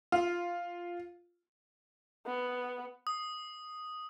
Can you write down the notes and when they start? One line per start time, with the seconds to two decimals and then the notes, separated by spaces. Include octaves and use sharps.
0.12 F4
2.26 B3
3.07 D#6